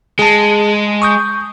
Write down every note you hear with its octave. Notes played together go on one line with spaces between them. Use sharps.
G#3 G#4 A5
C#6 D#6 G6